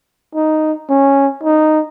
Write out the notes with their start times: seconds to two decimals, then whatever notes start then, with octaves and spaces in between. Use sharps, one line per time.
0.35 D#4
0.90 C#4
1.44 D#4